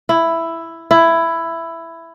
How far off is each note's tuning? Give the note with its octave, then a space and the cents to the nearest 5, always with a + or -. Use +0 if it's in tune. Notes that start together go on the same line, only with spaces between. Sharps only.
E4 +5
E4 +10